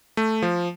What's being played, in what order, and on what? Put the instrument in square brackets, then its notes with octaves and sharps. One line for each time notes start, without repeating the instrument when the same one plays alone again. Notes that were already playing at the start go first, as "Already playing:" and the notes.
[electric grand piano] A3
F3